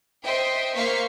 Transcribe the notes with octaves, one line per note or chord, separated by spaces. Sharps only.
C5 D#5 E5 G5
A#3 C5 F5 C#6 B6